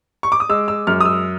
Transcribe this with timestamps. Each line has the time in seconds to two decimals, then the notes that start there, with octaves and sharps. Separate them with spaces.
0.23 C#6
0.32 D6
0.40 D#6
0.49 G#3 E6
0.68 E6
0.87 F#2 F6
1.01 D#6
1.05 E6